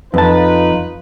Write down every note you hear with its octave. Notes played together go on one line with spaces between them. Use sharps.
F2 D#4 F4 B4 A5